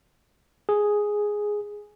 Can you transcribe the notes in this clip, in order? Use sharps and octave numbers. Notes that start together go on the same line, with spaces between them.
G#4